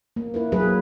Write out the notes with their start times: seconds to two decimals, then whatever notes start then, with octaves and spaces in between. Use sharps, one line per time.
0.16 A#3
0.34 E4 A#4 B4
0.52 F#3 A#3 G#4 B4